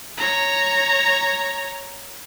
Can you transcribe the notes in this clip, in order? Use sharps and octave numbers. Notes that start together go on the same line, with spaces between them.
C#5 A#5